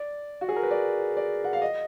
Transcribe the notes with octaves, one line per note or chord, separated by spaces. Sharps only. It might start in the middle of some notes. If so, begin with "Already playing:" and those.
Already playing: D5
F#4
G#4
A#4
B4
D5
D5
F#5
F5
D#5